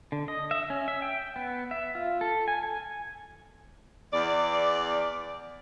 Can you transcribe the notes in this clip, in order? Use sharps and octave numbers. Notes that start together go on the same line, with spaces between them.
D3
D#5
E5
C#4
E5
G5
B3
E5
F4
A4
G#5
G#5
E2 D5